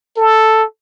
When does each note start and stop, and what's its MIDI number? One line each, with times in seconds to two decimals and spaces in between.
0.17 0.64 69